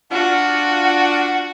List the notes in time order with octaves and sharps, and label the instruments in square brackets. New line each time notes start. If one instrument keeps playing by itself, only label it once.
[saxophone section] D4 F4 [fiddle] F#4 [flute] F#5